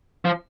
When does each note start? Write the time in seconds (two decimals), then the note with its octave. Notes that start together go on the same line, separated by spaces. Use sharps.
0.25 F3